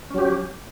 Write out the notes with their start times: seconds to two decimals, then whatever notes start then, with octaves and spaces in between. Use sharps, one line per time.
0.10 C#4
0.14 F#3
0.18 G4